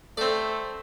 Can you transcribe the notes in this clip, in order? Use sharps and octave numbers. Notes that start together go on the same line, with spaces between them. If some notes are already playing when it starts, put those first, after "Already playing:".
A3 C4 A4 D5